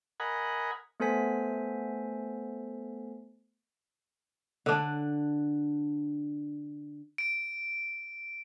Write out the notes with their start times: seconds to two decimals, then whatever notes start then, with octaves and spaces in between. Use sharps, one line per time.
0.20 A#4 D#5 F#5 G#5 B5
1.00 A3 B3 A4 C5 G#5 B6
4.66 D3 D4
7.18 D7